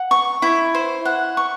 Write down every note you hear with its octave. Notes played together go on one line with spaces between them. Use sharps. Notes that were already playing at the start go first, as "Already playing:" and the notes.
Already playing: F#5
C#6
E4
C5
F#5
C#6